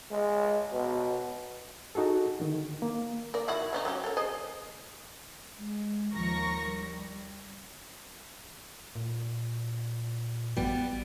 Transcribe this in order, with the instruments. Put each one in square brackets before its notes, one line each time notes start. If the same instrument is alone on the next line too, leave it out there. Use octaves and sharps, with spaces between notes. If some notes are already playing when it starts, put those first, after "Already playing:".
[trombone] G#3
B2
[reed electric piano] D#4 F#4 G#4 A4
D3 D#3
A#3
[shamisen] A#4 D5
D#3 E4 F#4
D3 C#4 D#4
F#3 C#4 G4
A4 A#4
G#4 C5 D#5
[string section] G#3
D#2 F3 A#4 C#6 A#6
G3
[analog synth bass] A#2
[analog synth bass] A1 [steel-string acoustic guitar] G3 B3